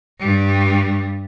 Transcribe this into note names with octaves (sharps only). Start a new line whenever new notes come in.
G2 G3